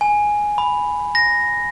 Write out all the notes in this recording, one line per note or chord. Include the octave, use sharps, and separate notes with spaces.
G#5
B5
A#6